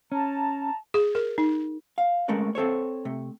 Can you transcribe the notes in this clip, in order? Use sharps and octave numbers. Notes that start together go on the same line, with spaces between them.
C#4 A5 A#5
G#4
A#4
D#4
F5
G#3 A3 C#4 A#4 B4
C4 A4 C5 C#5
C3 A3